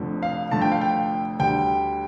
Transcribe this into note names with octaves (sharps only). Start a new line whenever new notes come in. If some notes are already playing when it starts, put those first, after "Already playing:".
Already playing: F1 F2 D3 A3
F5
F1 F2 D3 A3 A5
G5
F5
G5
D2 D3 G3 G5